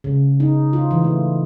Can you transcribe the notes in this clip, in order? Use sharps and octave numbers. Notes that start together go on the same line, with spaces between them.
C#3
D#4
F4
E3
A3